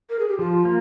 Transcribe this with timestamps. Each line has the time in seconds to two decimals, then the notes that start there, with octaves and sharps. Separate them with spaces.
0.10 A#4
0.19 G#4
0.29 G4
0.39 F3 F4
0.65 A#3